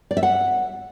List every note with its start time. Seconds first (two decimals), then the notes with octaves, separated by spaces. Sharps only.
0.11 D5
0.17 E5
0.23 F#5